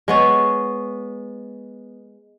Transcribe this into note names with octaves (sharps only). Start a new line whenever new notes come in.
G#3 B3 C#5